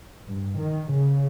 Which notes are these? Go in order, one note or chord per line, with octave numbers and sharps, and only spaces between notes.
G2
D#3
C#3